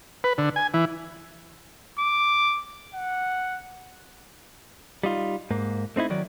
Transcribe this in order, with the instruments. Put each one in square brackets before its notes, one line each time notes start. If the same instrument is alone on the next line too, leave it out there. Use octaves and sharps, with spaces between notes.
[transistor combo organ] B4
D3
G#5
E3
[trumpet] D6
F#5
[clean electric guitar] G3 D#4 F4
G#2 A#3
A3 C4 D#4 E4
D#3 F#3 D5